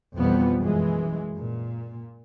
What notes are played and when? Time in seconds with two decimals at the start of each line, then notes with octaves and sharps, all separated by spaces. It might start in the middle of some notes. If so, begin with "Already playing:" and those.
0.15 B1 F2 E3 F3 G3 B3
0.61 F#2 E3 G#3
1.37 A#2